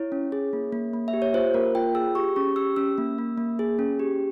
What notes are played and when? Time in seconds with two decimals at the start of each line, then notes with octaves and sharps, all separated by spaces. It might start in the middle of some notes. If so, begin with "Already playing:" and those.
Already playing: E4 C#5
0.12 C#4
0.32 G#4
0.53 A#3
0.73 A#3
0.93 A#3
1.08 E5
1.13 G4
1.22 C#5
1.34 F4 C5
1.54 A#3 A#4
1.75 F4 G5
1.95 G#4 E6
2.15 G4 C#6
2.36 C#4 C#6
2.56 G4 E6
2.76 C#4 E6
2.98 A#3
3.18 A#3
3.38 A#3
3.59 G#4
3.79 C#4
3.99 G4